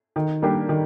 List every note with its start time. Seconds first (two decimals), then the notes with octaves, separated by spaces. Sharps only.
0.16 D#3
0.42 G3 A#3 D4 G4
0.69 D#3